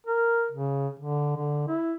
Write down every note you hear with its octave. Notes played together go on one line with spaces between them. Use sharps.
A#4
C#3
D3
D3
E4